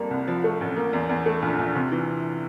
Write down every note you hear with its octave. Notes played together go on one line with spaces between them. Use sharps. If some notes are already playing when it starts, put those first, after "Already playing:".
Already playing: F2 G3 A#3
C2
F3
A3
A1
A#3
E2
E2
A3
A#1
A#1
C3
E3